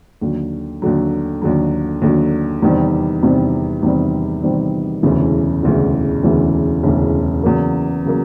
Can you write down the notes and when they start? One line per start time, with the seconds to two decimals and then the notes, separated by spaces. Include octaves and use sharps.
0.21 D#2 D3 F#3
0.82 D#2 D3 F#3
1.42 D#2 D3 F#3
2.02 D#2 D3 F#3
2.62 E2 C3 D#3 G3 C4
3.23 E2 C3 D#3 G3 C4
3.83 E2 C3 D#3 G3 C4
4.43 E2 C3 D#3 G3 C4
5.03 E1 D2 C#3 E3
5.63 E1 D2 C#3 E3
6.23 E1 D2 C#3 E3
6.83 E1 D2 C#3 E3
7.43 E2 C#3 F#3 A#3
8.06 C#3 F#3 A#3